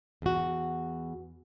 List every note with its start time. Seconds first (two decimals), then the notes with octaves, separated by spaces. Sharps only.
0.22 E2 F#4